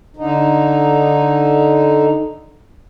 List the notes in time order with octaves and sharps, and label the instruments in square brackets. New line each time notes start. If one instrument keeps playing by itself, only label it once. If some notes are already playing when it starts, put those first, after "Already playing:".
[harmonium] D3 D#4